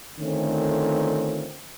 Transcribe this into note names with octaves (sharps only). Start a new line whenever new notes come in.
D3 D#3 A3 C4 C#4 F4